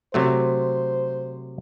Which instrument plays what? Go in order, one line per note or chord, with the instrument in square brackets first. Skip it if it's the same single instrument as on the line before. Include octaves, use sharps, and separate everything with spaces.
[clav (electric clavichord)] C3 F#3 A3 [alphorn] C5